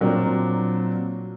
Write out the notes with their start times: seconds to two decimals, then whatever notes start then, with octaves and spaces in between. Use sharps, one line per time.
0.01 A#2 F#3 A#3 C4 D4